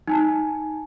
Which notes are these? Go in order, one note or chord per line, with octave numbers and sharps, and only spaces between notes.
D#4 G#5 A5